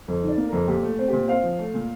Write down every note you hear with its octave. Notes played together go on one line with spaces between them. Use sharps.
F2
D#3
D5
A#3
F2 A#4
A#2 G4
A3
C4
A#2 G4
C4 F5
F3
A3
A#2